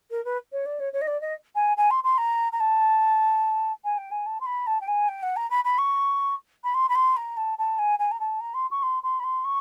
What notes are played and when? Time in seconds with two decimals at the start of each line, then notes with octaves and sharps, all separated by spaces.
0.10 A#4
0.25 B4
0.52 C#5
0.66 D5
0.79 C#5
0.93 C#5
1.01 D#5
1.07 D5
1.21 D#5
1.55 G#5
1.77 G#5
1.90 C6
2.04 C6
2.18 A#5
2.52 A#5
2.60 A5
3.84 G#5
3.98 G5
4.11 G#5
4.26 A5
4.40 C6
4.46 B5
4.67 A5
4.81 G5
4.87 G#5
5.08 G5
5.22 F#5
5.36 A#5
5.50 B5
5.64 B5
5.78 C#6
6.64 B5
6.74 C6
6.89 B5
6.95 C6
7.16 A#5
7.37 A5
7.58 A5
7.78 G#5
7.99 G#5
8.11 A#5
8.20 A5
8.40 A#5
8.54 C6
8.71 C#6
8.82 C6
9.03 C6
9.19 B5
9.24 C6
9.44 C#6